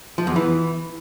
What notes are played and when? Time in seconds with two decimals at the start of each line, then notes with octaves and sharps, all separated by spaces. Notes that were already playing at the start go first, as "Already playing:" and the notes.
0.18 F3
0.27 E2
0.36 E3